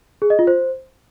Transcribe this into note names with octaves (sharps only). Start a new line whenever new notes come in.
G#4
D#5
F4
C5